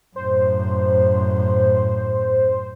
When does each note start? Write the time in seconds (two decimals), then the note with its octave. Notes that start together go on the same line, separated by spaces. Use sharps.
0.16 F#2 A2 C5